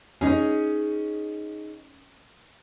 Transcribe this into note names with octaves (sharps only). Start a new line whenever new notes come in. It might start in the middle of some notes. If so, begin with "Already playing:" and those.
C#4 D#4 G#4